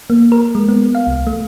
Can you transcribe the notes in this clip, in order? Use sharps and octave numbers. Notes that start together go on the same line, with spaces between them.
A#3
A#4
G#3
B3
F5
C2
A3